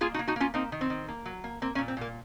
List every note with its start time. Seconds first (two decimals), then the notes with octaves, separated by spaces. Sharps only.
0.01 A#3 F4 G#4
0.14 D#4 F#4
0.19 A#3
0.28 D#4 F#4
0.36 A#3 C#4 F4
0.54 A#3 C4 D#4
0.72 D#3
0.81 C4
0.90 D#3
1.08 A#3
1.26 F#3
1.44 A#3
1.62 A#3 C4
1.75 A#3 C#4
1.79 A#2
1.88 C4
1.97 A#2 A#3